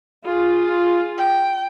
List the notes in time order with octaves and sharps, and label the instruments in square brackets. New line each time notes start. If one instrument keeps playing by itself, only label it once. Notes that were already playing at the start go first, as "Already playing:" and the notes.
[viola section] F4 G#4
[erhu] G5